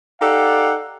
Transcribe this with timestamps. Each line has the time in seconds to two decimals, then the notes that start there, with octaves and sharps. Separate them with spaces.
0.21 D#4 G4 A4 D5 F5 F#5